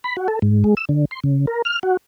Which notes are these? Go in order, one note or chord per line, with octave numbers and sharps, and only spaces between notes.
B5
F#4
A4
G#2
G#3
E6
D3
C6
C#3
A#4
F6
F#4